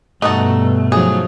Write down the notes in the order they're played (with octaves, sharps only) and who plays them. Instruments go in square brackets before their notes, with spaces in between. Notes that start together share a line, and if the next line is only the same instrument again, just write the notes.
[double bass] G2 B2 [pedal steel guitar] A3 [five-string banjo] D#4 F#4 A4
[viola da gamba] F3 F#3 D#4 [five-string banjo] G#4